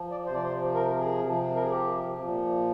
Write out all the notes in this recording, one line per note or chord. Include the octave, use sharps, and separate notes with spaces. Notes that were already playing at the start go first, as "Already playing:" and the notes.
Already playing: F3
D5
C3 C5
F3 D5
C5
A#4
G#4
C3 F3
A#4
G#4
G4
A#2 F3